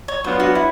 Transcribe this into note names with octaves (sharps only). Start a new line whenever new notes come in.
C#5
F#3 B3 D4 F4 C5
F#4
E4